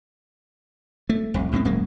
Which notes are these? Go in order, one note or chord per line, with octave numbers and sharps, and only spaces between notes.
A3
F1 C2
D2 A2 G#3 C4
D#1 F#2 G#3 A#3